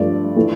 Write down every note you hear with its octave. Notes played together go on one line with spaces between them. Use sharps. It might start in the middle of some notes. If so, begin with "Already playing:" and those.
Already playing: G2 F3 A3 D5
E3 A3